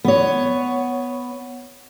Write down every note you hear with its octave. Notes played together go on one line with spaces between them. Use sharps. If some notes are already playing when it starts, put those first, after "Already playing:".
B3 C#5